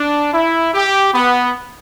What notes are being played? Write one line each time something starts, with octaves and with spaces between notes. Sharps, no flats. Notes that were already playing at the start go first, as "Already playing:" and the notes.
Already playing: D4
E4
G4
B3